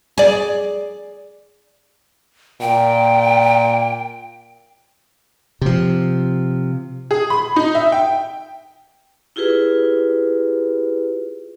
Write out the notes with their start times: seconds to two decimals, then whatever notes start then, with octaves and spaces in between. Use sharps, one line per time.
0.18 G#4 D5
2.61 A#2 G5
5.61 C3 F3
7.11 G#4
7.30 B5
7.56 D#4
7.75 E5
7.92 G5
9.36 E4 F4 G4 G#4 B4